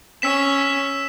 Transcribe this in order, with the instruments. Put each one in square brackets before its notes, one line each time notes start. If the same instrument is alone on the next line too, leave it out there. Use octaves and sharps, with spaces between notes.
[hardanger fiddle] C#4 [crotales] E6 B6 E7